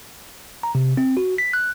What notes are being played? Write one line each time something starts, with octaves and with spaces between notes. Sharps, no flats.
A#5
C3
C4
F#4
B6
F#6